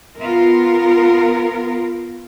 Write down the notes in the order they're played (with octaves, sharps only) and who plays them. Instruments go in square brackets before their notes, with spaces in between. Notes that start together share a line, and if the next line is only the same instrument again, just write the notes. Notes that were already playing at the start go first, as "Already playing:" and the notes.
[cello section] B3 F4 A#4